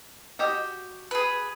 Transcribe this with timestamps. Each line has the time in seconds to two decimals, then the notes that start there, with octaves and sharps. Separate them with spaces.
0.39 F#4 G4 D#5
1.11 G#4 B4